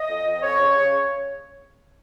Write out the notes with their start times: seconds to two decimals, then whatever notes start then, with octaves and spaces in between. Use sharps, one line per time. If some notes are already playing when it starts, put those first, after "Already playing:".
Already playing: D#5
0.08 F2
0.26 F2
0.42 F2 C#5
0.59 C#3
0.76 C#3